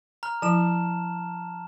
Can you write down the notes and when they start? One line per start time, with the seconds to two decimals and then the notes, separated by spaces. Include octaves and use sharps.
0.23 A#5 F6
0.42 F3 E4 A5 E7